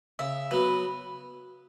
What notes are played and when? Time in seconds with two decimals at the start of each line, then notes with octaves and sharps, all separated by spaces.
0.19 C#3 E5
0.51 F#3 B3 F#4 B4